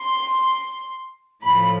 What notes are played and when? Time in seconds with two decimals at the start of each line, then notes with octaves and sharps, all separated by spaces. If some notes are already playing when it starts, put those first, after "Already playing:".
Already playing: C6
1.42 A2 F3 A3 B5